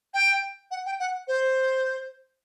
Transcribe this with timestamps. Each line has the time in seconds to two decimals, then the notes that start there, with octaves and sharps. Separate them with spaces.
0.14 G5
0.71 F#5
0.86 G5
1.00 F#5
1.28 C5